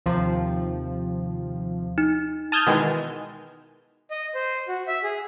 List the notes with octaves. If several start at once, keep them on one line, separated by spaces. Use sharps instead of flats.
D#2 C3 F3
D#4
A5 D#6 F6 G6 G#6
B2 D#3 E3 G#3
D#5
C5
F#4
E5
G#4